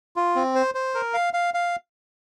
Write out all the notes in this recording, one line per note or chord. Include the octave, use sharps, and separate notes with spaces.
F4
C4
C5
C5
A#4
F5
F5
F5